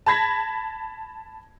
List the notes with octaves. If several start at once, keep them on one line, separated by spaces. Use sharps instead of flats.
A5 B5 G#6 A#6 B6